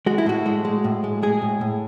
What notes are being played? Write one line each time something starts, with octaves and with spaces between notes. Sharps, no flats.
G#3 F#4
E4
A2 F#4
G#3
G#3
A2
G#3
G#3 G#4
A2
A2